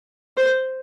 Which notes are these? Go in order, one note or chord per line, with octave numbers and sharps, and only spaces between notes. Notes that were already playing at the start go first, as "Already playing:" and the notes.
C5